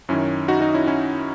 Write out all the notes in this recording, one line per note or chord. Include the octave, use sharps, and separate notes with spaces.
F#2 D#3 C#4 E4
D#4 F#4
D#4 F#4
C#4 E4
C#4 E4